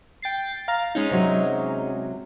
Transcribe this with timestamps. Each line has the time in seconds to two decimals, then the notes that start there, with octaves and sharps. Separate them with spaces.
0.22 G5 A6 C7
0.68 F5 A#5 A6
0.95 G#3 C#4 D#4
1.10 C3 F#3